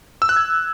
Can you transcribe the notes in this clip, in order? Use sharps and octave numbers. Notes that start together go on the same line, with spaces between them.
E6
F#6
G#6